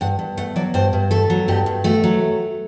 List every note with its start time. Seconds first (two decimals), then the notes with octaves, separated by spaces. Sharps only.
0.01 G2 F#5
0.19 G2
0.37 A3 F#5
0.56 F#3 D5
0.74 G2 C5
0.93 G2
1.11 A3 A4
1.30 F#3
1.48 G2 G4
1.66 G2
1.84 A3 F#4
2.04 F#3